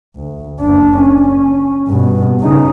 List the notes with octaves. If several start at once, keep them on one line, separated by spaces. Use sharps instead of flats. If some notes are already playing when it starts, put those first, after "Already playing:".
D2
F#1 D4
C#4
G2 B2
C#3 D#4